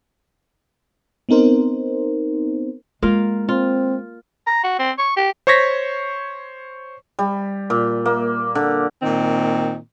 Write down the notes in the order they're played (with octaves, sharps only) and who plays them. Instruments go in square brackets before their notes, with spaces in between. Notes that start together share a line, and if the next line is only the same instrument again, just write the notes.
[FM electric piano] B3 C4 D#4 A#4 C5
[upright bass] G#3 [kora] A#3 F4 F5
[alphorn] C4 [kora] F4
[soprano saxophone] A#5
F#4
C4
C#6
G4
[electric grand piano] C5 C#5 C#6 G#6 A#6 B6
[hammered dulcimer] G3
A#2
A#3
D3
[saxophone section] A#2 D#3 C4